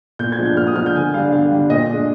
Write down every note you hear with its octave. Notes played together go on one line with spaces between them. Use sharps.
A#2 G6
G#6
F3 G#3 D4
G6
A#2 F6
D#6
F3 G#3 D4 F6
G6
D3 G#5
G3 D4 F5
D3 F5
G3 D4
A#2 D#5
G#3 D4